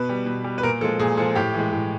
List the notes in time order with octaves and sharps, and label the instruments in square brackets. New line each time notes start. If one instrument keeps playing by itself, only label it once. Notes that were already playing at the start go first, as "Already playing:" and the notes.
Already playing: [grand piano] B2 B4
G3
B2
G3
B4
A#2 A#4
F3 G#3 A4
A#2 G#4
F3 G#3 A4
A2 G4
E3 G#3
A2